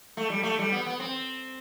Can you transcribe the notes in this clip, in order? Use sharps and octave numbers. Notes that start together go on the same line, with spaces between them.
A3
G3
A3
G3
B3
B3
C4